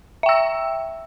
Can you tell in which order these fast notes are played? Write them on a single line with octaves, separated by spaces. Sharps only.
E5 G5 E6